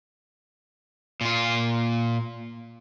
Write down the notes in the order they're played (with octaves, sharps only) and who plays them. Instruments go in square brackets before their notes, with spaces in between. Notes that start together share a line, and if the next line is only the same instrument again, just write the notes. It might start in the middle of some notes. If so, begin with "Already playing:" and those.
[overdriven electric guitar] A#2 F4